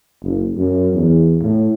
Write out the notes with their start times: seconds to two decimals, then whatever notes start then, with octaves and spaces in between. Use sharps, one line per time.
0.23 F#1
0.56 F#2
0.94 E2
1.42 A2